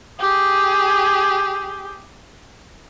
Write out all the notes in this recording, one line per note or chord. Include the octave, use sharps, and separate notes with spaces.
G4 G#4